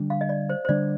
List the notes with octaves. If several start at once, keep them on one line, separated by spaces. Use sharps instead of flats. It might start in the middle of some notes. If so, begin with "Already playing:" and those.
Already playing: D3 G3 D4
F5
D#5
D5
C5
C5
D3 G3 D4 D5